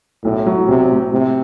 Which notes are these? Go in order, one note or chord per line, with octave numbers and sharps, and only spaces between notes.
B1 A2
F#3
B1 C3
A2
A2 C3